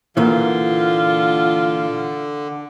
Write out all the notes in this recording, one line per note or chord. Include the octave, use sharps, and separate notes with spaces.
A#2 D3 E3 F4